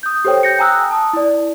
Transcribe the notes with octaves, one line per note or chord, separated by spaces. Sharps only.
D#6 G6
G4 A4 C5 C#5 G5
G6 A#6 C#7
G5 G#5 A#5 D#6 E6 F#6
A5 D#6
E4 D5